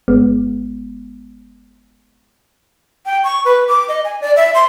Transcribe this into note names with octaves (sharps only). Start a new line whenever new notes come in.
G1 G#3 B3
G5
C#6
B4
D6
D#5
G#5
D5
E5
C6